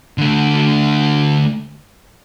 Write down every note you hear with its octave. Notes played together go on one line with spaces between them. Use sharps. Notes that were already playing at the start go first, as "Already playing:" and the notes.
D3 A3